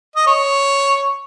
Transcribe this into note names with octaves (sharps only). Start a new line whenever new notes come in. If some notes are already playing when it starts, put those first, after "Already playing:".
D#5
C#5